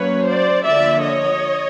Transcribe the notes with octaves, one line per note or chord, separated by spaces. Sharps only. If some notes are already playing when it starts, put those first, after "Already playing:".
Already playing: F#3 A#3 C#4 B4 C#5
C5 D5
D3 F3 A#3 D5 E5
C#5 D#5